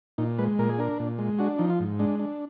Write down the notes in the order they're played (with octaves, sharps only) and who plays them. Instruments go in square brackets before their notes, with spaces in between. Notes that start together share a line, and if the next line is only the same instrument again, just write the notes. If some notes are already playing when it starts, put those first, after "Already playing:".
[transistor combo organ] A#2 D#4
G#3 B4
A#2 A#4
G#4
D4 A#4
A#2
G#3
D4 F#4
F3 D#4
F4
G#2
G#3 D4
D4